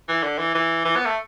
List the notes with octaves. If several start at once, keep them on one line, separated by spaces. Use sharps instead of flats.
E3
D3
E3
E3
E3
B3
A3